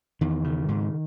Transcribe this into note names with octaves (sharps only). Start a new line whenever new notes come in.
E2 D#3
C#3
G#2